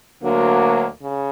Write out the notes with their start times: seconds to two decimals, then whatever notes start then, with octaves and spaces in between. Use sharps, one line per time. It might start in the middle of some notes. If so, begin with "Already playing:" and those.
0.23 D2 D3 F#3 A#3
1.02 C#3